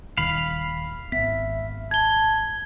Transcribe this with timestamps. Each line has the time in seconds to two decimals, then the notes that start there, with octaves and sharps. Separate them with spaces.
0.17 D#1 D#3 F5 B5
1.12 G#1 B3 E5 B6
1.91 A5 G#6 G7